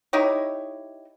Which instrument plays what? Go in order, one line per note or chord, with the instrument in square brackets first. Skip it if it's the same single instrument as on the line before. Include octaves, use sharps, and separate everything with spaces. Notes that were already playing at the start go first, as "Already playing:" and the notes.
[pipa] D#4 E4 G4 C#5